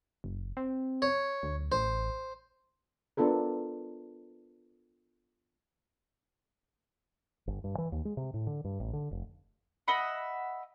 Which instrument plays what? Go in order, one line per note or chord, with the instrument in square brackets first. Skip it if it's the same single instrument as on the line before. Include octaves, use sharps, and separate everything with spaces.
[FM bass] F#1
C4
[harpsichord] C#5
[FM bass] D2
[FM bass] A1 [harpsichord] C5
[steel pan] B3 D4 F4 A4 A#4
[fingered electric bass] G1
G2
E3
D#2
G#3
C3
A2
D3
G2
A1
D3
F1
[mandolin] D#5 E5 F#5 B5